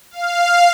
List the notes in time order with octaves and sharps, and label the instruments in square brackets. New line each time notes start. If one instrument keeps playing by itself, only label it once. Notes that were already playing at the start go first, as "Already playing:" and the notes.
[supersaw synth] F5